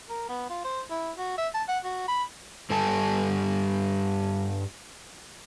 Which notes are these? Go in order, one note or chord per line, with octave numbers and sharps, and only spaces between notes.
A#4
B3
F4
C5
E4
F#4
E5
A5
F#5
F#4
B5
G2 G3 G4 A4 G#5 A5